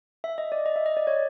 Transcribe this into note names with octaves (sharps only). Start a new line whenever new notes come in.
E5
D#5
D5
D#5
E5
D#5
D5
C#5